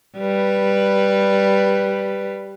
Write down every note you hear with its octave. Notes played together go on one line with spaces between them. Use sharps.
G3 B4